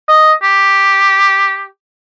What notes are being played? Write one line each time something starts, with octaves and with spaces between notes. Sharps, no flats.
D#5
G4